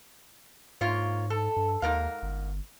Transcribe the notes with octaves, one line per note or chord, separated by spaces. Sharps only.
G#2 A#3 F4 C#5
A4
G2
D#2 G#2 A#4 F5
G1